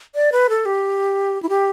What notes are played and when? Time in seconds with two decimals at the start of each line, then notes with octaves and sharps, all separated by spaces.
0.15 D5
0.32 B4
0.49 A4
0.66 G4
1.43 E4
1.49 G4